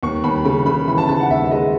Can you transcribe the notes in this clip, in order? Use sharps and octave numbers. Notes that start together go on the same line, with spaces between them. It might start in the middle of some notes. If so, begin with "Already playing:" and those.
D#2 C#6
D#2 B5
C#3 B5
C#3 B5
E3 B5
A5
C#3 A5
F#5
D#2 E5
E5
G#3 D#5